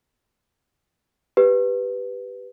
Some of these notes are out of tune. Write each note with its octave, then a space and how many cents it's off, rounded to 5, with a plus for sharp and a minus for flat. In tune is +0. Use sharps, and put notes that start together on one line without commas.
G4 +0 B4 +0